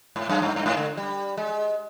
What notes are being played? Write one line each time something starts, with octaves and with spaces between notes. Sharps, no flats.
G#2
F#2
G2
G2
G#2
D3
G3
G#3